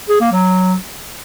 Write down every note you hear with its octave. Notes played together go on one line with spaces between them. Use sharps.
G#4
A#3
F#3